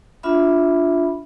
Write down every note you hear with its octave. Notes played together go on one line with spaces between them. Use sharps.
D4 F4 E5 B5